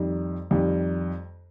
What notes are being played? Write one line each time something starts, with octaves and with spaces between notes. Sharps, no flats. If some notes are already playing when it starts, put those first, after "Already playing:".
Already playing: F2 D#3 G3
F2 D#3 G3